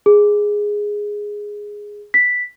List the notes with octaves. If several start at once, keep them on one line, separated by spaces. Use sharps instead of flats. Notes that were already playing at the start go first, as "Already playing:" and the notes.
G#4
B6